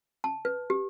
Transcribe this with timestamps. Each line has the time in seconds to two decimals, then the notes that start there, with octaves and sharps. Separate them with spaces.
0.24 A5
0.45 B4
0.70 G4